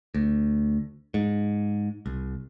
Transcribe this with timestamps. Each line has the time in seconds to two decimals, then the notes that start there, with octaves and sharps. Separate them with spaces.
0.14 D2
1.14 G#2
2.06 C2